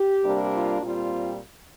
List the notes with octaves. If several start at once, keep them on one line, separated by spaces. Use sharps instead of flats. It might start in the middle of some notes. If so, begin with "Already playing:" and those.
Already playing: G4
C3 G3 A#3 D4
F4
A#2 G3 C4 F4